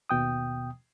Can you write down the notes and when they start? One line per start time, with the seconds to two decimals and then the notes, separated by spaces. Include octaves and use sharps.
0.10 D#2 B2 G5 D#6